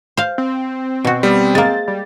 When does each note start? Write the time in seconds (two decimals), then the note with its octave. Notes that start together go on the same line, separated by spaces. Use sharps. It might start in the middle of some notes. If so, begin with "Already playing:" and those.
0.17 C5 F5
0.38 C4
1.05 B2 F#4
1.23 G3 B3
1.55 G#3 A#3 A6
1.88 G3